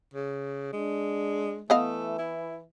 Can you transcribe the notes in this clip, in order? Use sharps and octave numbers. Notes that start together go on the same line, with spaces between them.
C#3
G#3 D4
E3 A3 B3 D#5 F5
E4